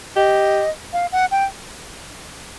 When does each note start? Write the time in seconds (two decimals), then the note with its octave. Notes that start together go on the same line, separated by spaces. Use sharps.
0.16 G4 D#5
0.93 F5
1.12 F#5
1.31 G5